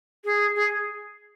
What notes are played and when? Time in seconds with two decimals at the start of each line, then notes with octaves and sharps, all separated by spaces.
0.25 G#4
0.56 G#4